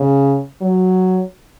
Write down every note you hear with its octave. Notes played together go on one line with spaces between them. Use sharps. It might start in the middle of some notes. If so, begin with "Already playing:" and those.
Already playing: C#3
F#3